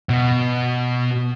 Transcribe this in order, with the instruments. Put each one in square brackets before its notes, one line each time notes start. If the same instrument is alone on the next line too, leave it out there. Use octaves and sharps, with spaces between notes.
[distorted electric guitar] B2 B3